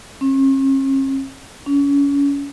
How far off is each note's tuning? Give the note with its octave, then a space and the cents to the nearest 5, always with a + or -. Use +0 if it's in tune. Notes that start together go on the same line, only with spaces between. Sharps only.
C#4 -45
C#4 +30